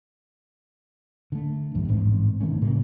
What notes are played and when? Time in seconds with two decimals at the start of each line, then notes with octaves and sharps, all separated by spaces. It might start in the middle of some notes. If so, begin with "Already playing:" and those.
1.32 D3 A3
1.74 A#1 E2 G2
1.88 A1 G#2 C4
2.40 E1 D#3 A3 C#4
2.61 A2 C#3 G3 A#3